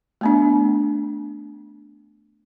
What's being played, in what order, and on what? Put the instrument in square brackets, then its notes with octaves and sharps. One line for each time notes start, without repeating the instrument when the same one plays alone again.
[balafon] A3 B3 D4